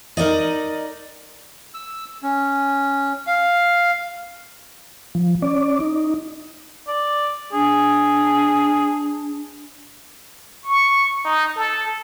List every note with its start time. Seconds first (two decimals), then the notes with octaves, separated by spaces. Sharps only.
0.17 D#4 A#4 D5 D#5
1.74 E6
2.23 C#4
3.27 F5
5.15 F3
5.42 C#4 D5
5.80 D#4
6.88 D5
7.53 D4 G#4
10.64 C#6
11.25 D#4
11.56 A4